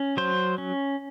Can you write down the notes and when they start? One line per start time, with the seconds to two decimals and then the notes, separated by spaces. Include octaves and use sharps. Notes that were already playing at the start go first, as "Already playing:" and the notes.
Already playing: C#4
0.17 F#3 C5
0.58 C#4